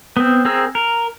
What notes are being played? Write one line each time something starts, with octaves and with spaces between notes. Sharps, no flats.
B3 C4
C4 G#4 A#4 E6
A#4